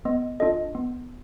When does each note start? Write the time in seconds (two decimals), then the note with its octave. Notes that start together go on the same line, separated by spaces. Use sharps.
0.05 B3 D#5
0.40 D4 F4 A4 D#5
0.75 B3